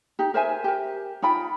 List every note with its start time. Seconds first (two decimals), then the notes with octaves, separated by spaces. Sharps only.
0.19 D#4 G4
0.34 A#4 C5 E5 G#5
0.64 G4 A#4
1.22 D#4 F4 G5 B5